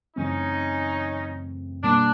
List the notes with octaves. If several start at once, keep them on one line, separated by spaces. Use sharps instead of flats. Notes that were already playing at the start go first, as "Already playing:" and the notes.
F#2 C#3 E3 A3 C4 C#4 D#4
B2 G3 A#3 D4